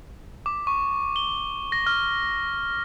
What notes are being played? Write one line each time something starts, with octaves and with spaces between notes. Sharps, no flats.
D6
C#6
G7
A#6
F6